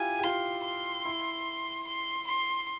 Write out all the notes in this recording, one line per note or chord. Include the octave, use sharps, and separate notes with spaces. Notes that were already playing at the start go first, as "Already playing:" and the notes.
Already playing: E4 F4 G4 G#5
G4
F4 C6
C6
E4
C6
C6